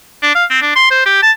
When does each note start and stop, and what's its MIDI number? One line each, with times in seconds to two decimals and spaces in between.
0.22 0.34 62
0.35 0.45 77
0.50 0.61 60
0.62 0.74 62
0.76 0.90 84
0.91 1.01 72
1.05 1.19 67
1.22 1.31 81